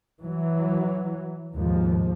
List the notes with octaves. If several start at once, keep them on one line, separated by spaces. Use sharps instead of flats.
E3 F#3
D#2 G#2 B2 F3